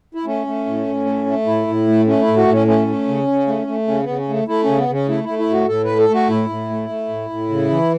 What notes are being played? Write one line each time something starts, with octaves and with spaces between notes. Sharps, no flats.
E4
A3 C#4
A3
A2
A2
A3
A3
A2 E4
A2
A3
A3 C#4
E4
A2
F#4
A2
C#4
A3 C#4
A3
C#3
C#3
A3
A3
C#3 C#4
B3
C#3
C#4
A3
A3 E4
C#3 C#4
B3
C#3
C#4
A3 E4
E4
A3
E4
A2 F#4
A2 A4
B4
A3
A4
A3
F#4
A2 E4
A2
A3
A3
A2
A2
C#3
E3